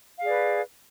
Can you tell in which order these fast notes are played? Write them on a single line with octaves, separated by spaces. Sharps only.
F5 G#4 D5 B4